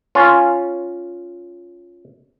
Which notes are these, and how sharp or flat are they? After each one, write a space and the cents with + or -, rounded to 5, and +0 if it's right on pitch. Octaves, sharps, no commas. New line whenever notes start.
C#4 +0 F4 +0